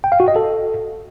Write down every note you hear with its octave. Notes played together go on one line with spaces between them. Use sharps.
G5
F5
F#4
D#5
A4